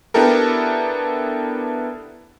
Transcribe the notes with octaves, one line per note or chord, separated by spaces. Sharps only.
B3 D4 E4 G4 A4 A#4